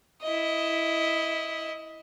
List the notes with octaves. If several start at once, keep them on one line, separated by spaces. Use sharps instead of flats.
E4 D#5